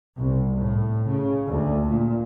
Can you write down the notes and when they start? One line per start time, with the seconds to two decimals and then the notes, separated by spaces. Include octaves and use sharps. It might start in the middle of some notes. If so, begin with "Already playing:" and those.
0.17 C2
0.57 A2
1.07 C#3
1.48 D2
1.88 A#2